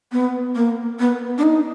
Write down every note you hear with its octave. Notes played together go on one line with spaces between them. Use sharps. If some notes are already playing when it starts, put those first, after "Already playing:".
B3
A#3
B3
D4
D#4